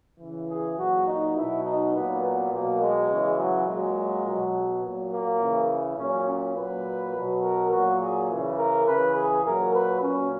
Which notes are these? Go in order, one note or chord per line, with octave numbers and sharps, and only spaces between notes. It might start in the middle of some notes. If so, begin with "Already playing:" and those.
C#3 E3
G#4
A#2 F#3 F#4
D#4
B2 F#3 E4
D#4
A#2 F#3 B3
B3
B2 F#3 A#3
G#3
C#3 E3
F#3
A#2 F#3 G#3
B2 F#3
A#2 F#3
A#3
C#3 E3
A#2 F#3 C#4
C#4
A#2 F#3 B4
B2 F#3
A#4
A#2 F#3 F#4
G#4
E3
C#3
A#4
C#3 E3 B4
G#4
A#2 F#3 A#4
B4
A#2 F#3 C#4